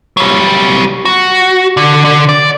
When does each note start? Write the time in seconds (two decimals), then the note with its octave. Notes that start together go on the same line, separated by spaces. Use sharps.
0.17 F#3 G3
1.05 F#4
1.77 D3
2.05 D3
2.29 D5